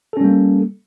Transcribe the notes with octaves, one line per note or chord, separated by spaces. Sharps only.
G3 A#3 C#4 A4